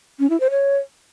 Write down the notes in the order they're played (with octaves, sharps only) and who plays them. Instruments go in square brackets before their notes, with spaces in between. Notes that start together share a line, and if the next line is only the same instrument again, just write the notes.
[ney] C#4
E4
C5
C#5